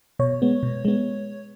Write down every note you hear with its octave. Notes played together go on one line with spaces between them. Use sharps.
B2 C#5
G#3 B3
B2
G#3 B3